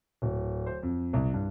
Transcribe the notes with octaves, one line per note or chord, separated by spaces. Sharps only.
D1
C5
F2
C2
G2